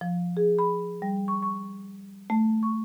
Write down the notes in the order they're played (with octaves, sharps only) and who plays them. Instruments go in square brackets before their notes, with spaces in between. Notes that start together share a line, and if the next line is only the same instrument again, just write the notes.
[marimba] F3
G#4
B5
G3
C#6
C#6
A3
C#6